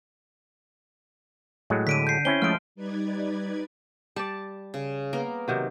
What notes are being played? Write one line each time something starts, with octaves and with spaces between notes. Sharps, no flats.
A2 F#3 G#3
D3 B6 D7 D#7
G6 C7
C4 C#4 E4 G7
F3 G#3 A3 F6 D7
G3 D#4 B4 D5 G#6
G3 D5 A5
C#3
A#3 B3 A#4
C3 D#3 F#3